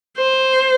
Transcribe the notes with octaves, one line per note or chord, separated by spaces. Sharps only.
C5